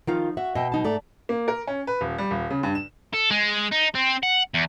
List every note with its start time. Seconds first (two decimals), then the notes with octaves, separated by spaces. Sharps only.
0.07 D#3 F3 D#4 F4 F5
0.37 F#4 E5
0.55 B2 D#5 E5 G5
0.72 F#3 D#4 A5
0.84 G#2 A3 D5 A#5
1.29 A#3
1.48 A#4
1.67 C#4
1.87 B4
2.01 D#1
2.18 G3
2.31 D#1
2.50 C#3
2.63 G2
2.75 E7
3.14 A4
3.31 G#3
3.72 D#4
3.95 C4
4.23 F#5
4.54 E2